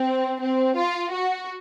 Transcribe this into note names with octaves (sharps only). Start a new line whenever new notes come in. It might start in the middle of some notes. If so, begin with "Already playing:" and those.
Already playing: C4
C4
F4
F#4